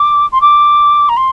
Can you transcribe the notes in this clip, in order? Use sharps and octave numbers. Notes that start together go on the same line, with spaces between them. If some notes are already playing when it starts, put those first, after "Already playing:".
Already playing: D6
C6
D6
A#5
C6